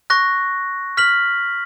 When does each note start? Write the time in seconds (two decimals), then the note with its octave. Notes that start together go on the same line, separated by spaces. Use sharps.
0.10 C#6 F#6 A#6
0.97 F6 B6 F#7